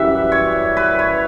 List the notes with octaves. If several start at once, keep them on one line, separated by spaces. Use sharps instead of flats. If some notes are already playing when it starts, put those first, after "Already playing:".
Already playing: F#2 E3 G3 E5 F#5
C#5
B4
C#5